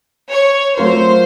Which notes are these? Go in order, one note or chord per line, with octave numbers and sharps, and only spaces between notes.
C#5
F#3 A3 C4 F4 A#4 C5